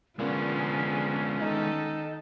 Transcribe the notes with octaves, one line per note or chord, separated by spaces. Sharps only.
A#2 D3 F3 G#3 B3 C#4
G#4
D#3 D#4 A4